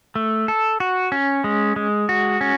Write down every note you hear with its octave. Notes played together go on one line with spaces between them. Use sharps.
A3
A4
F#4
C#4
G#3
G#3
F#4
C#4